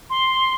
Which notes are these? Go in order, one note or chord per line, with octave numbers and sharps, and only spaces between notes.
C6